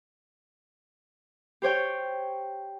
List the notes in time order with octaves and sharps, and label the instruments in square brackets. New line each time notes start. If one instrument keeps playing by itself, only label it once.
[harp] G4 C5 C#5 G5